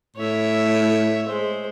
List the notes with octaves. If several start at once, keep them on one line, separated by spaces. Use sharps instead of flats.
A2 C#5 E5
G#3 C5